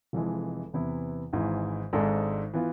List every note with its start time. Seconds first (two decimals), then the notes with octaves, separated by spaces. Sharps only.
0.13 F1 F2 E3 G#3
0.74 E2 C3 E3 B3 E4
1.33 G#1 G#2 E3
1.93 G#1 G#2 G#3 D4 A4
2.54 E3 B3 F4